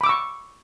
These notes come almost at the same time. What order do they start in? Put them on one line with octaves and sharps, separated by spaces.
B5 D6 E6 C#6